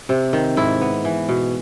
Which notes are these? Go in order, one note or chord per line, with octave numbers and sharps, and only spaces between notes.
C3
D#3
G#2 E4
B3
E3
B2